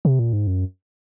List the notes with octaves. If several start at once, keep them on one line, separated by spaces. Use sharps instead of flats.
C3
A#2
G#2
F#2